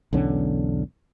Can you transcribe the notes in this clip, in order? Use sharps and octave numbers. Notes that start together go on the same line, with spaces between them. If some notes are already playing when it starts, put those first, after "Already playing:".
B1 E2 D3 C#4